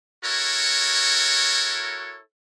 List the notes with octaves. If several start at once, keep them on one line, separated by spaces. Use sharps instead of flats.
E4 F#4 A4 A#4 C#5